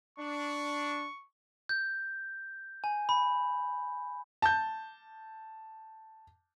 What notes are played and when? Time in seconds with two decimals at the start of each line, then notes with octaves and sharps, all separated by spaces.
0.19 D4 C#6
1.69 G6
2.84 G#5
3.09 B5
4.42 A5 G6